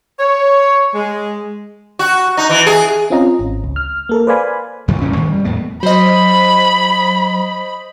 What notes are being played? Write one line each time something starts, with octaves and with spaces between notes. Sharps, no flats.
C#5
G#3
F#4
D#4
E3
G#4
C4 C#4 F4 D#5 A#5
G#1
C#2
F6
A#3 A4 A#4
B4 C5 D5 F5 G#5 B5
A1 F2 D3 F3
D#1 A1 A2 C#4
G2 D#3 E3
G2 G3
E2 A2 C3 B3
F#3 C5 D#5 B5